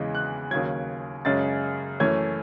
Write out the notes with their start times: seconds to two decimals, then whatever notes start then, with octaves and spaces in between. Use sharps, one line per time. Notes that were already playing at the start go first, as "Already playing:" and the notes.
Already playing: E2 C#3 E3 G#3
0.15 F#6
0.51 D#2 C#3 F#3 G#6
1.25 F#2 C#3 G#3 C#4 A6
2.00 F#2 E3 A3 C#4 G#6